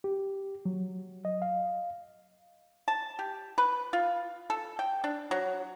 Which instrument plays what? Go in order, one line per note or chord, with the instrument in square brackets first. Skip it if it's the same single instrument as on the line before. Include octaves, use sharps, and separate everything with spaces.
[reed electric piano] G4
F#3
D#5
F5
[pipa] A5
G4
B4
F4
A4
G5
D4
F#3